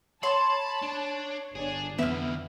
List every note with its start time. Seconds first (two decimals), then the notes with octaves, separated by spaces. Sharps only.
0.23 C#5 A5 B5 C6
0.83 D4
1.55 G1 D4 G#4
1.99 F2 D3 E3 B3 E5 F6